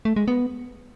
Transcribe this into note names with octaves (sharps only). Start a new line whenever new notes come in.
A3
G#3
B3